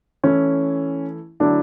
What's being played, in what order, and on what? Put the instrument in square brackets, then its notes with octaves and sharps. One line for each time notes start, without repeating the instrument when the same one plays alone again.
[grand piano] E3 A3 E4 [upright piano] C#4
[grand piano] D3 F#3 A3 E4 [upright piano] D4